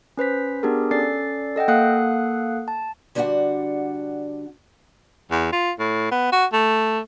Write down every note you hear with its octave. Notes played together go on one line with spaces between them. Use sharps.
C#4 B4 C5 B6
B3 D4 G4 G#4 A#4
C#4 A4 D5 A6 C7
A4 D#5 F#5 G5
A#3 A4 F5 F#5 D#6 F#6
A5
D3 G3 D4 D#4 F#4 F#5
E2
F4
A2
B3
F#4
A3